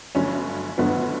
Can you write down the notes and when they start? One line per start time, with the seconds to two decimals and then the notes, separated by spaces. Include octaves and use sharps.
0.15 G1 G2 D3 F#3 A3 C#4
0.78 G1 G2 D3 F#3 A3 B3